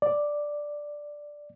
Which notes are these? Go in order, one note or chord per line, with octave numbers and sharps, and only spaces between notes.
D5